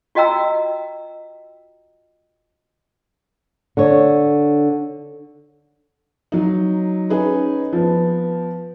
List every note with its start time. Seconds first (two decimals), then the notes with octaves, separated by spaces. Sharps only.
0.15 F4 F#4 D#5 G5 A#5 E6
3.77 D3 C#5
6.32 F#3 D#4
7.10 C#4 D#4 G#4 B4
7.73 F3 B3